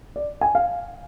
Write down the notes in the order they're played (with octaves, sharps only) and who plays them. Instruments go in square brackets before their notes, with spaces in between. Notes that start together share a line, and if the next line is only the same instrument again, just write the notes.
[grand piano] D5
G#5
F5